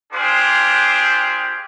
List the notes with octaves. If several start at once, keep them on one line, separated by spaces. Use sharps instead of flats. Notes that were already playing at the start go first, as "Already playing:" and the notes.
D4 F4 G4 G#4 C5